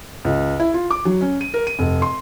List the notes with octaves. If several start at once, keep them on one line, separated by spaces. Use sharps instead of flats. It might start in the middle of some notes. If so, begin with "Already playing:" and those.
C#2
E4
F4
D6
F#3
C#4
D#7
A#4
D#7
F1
C6